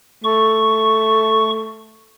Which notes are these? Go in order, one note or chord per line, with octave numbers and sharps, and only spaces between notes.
A3 C#6